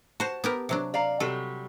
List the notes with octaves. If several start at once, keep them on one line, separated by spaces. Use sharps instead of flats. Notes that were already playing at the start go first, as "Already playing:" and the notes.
F#4 C5 A5
B3 G4 A#4
C3 F#3 D4
D5 F5 A#5
C3 F#3 G3 A4